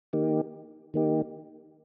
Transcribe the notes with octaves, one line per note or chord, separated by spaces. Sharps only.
D#3 A#3 D#4 G4
D#3 A#3 D#4 G4